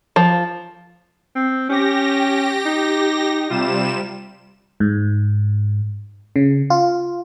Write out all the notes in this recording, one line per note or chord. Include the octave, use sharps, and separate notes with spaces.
F3
C4
C#4 G4 A#6
D#4
C3 G3 F4 E7
G#2
C#3
F4